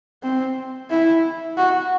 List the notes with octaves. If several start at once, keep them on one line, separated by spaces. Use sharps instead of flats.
C4
E4
F#4